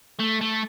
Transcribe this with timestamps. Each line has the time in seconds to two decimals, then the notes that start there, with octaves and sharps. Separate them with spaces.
0.19 A3
0.41 A3